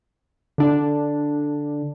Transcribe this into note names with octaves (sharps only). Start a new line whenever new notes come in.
D3 D4